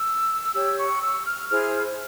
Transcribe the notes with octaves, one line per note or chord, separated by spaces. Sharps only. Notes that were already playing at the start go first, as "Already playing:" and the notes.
Already playing: E6
G4 C#5 E6
C#6
E6
F6
E4 G#4 C5 F6